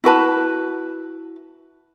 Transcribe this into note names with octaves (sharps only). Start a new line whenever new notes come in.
E4 F#4 B4 A5